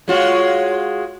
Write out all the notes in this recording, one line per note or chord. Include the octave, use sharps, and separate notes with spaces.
G#3 F4 F#4 C#5